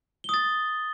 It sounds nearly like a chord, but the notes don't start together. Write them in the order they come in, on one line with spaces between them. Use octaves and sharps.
G7 D#6 A6